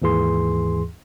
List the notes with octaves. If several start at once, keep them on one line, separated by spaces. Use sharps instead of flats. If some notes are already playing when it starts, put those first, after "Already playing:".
D#2 G#2 E3 G#4 C6